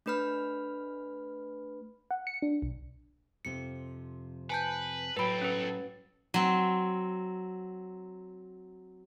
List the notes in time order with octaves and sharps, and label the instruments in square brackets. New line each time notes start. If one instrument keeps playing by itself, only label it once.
[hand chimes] A3 D4 B4 B5 F6
[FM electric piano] F#5
C#7
D4
B1
[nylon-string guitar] F2 C3 F3 [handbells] C#7
[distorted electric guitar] B4 [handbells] G#5 A5 G6
[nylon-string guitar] A2 F#3 [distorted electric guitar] A4 G5 [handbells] B4 B5
[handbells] C#4 B4
[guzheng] F#3 C4